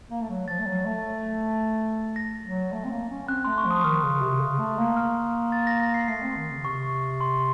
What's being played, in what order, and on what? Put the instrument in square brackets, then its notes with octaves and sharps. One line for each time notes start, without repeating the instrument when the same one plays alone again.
[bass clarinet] A#3
A3
F#3
[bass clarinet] F3 [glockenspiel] A6
[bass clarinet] A3
F#3
A3
[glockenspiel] A#6
[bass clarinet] F#3
A3
C4
A#3
C#4
[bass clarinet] C4 [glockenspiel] F#6
[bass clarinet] A3 [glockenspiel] C6
[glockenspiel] C#6
[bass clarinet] F3 [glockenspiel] D#6
[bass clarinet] D#3 [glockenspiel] F6
[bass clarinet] C#3
C3
C#3
A3
A#3
[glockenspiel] F6
A6
A#6
A#6
C7
[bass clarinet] A3 [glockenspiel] C7
[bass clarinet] C4
D#3
C#3
[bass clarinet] C3 [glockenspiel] C#6
[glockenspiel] C6